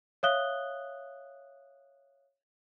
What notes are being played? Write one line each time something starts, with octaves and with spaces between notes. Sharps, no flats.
C#5 E5 F5 D#6 F#6 G7